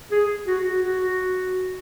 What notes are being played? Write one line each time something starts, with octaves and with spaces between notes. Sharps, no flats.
G#4
F#4
F#4